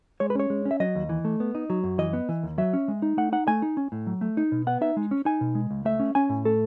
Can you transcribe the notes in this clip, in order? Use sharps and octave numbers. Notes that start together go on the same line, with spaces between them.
G#3 C#5
B4
C#4 C#5
G#3
C#4
E5
F#3 D#5
D#2
E3
A3
B3
D#4
F#3
F#2
E3 D#5
B3
E3
D#2
F#3 E5
C#4
G#3
D#4
A3 F#5
D#4 F#5
A3 G#5
D#4
C#4
A2
F#3
A3
D#4
B2
B3 F#5
D#4 E5
G#3
C#4
D#4 G#5
B2
G#3
C#2
A3 E5
C#4
C#4 G#5
A2
A3 A4